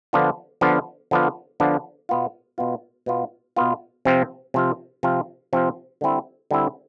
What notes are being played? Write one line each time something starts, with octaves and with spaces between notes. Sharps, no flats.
D3 F3 B3 D4 F4
D3 F3 B3 D4 F4
D3 F3 B3 D4 F4
D3 F3 B3 D4 F4
B2 B3 F4
B2 B3 F4
B2 B3 F4
B2 B3 F4
C3 F3 C4 F4
C3 F3 C4 F4
C3 F3 C4 F4
C3 F3 C4 F4
D3 G3 C4 E4
D3 G3 C4 E4